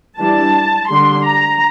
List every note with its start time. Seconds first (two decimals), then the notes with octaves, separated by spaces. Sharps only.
0.18 E3 G3 D4 A5
0.89 D3 G3 D4 C6
1.25 A#5